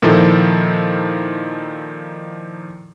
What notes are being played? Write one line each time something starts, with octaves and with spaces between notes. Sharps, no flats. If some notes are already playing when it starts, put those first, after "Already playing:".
A#2 D#3 F3 E4 A4